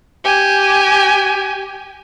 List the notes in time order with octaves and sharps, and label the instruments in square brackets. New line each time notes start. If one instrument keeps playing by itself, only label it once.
[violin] G4 G#5